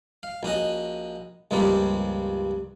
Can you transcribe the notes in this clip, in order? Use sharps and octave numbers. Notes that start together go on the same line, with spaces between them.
F5
A#1 C#4 F#4 D#5
C#2 G2 F3 G3 A#3 C4